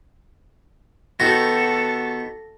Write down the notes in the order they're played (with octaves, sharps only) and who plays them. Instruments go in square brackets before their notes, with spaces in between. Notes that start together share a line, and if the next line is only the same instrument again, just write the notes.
[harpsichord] D#3 F#4 G4 [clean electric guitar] B3 [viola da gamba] A4 [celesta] A#6